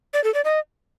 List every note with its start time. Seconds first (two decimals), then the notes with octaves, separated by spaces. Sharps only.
0.14 D5
0.24 A4
0.34 D5
0.45 D#5